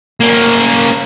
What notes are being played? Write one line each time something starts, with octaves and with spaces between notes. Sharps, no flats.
A#3 C#4